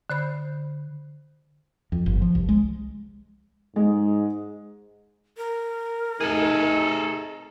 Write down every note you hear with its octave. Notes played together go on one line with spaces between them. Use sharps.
D3 C5 B5 G6
F2
G1
F3
C2
G#3
G#2 G#3
A#4
C3 A3 D#4 G#4 A4